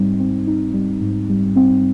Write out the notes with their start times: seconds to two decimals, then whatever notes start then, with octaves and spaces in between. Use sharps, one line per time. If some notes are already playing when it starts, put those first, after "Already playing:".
Already playing: G#2 G3 C4 D#4
0.20 C4
0.47 D#4
0.74 G3
1.01 G#2
1.29 G3
1.56 C4